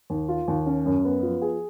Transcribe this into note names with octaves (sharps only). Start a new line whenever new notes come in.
D#2
F4
D#2
C#4
F#2
B3
F3
G#4